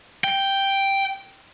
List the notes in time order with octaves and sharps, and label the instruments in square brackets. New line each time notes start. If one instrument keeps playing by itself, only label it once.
[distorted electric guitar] G5